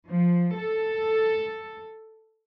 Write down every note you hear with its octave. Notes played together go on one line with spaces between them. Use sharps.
F3
A4